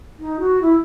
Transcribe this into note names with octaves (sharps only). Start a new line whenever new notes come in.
D#4
F#4
E4